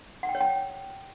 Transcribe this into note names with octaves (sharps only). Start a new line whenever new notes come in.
F#5
G5
C#5
G5